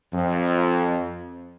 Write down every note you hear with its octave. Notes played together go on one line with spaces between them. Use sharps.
F2